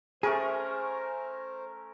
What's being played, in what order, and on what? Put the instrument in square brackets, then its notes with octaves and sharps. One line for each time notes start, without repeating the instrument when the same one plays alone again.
[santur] A3 C#4 A#4 [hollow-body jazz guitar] G#4 [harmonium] C5